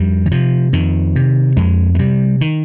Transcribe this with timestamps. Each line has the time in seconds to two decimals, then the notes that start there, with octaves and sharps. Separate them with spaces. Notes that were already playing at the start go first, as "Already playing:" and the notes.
Already playing: F2 G3
0.26 D#3
0.31 C3 F3
0.73 F2 D#3
1.16 C3
1.57 F2 G#3
1.95 G#3
1.99 C3 G3
2.41 D#3